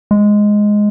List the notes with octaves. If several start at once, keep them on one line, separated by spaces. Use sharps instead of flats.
G#3